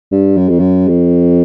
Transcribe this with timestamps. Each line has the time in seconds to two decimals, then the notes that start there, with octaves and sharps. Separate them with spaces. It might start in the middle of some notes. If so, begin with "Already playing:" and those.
0.12 G2
0.37 F#2
0.49 F2
0.59 F#2
0.88 F2